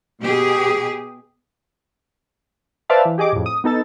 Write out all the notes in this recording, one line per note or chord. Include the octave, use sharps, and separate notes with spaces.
B2 G4 G#4
B4 C5 D5 E5 F5 A5
E3
G4 G#4 D#5 D6
F2 A2
D#6
B3 D#4 A4 A6